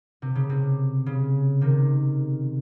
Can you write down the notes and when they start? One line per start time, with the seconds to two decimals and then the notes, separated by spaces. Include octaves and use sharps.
0.22 C3
0.35 C#3
0.50 C3
1.06 C#3
1.61 C3 D#3